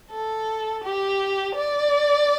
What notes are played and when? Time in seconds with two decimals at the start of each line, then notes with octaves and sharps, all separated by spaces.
0.12 A4
0.84 G4
1.55 D5